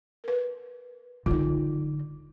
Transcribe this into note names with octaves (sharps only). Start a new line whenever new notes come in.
A#4 B4
D3 D#4 F4